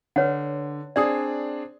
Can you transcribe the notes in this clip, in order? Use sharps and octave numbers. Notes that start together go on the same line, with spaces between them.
D3 B4 C#5 F#5
C4 D4 G#4 D5 D#6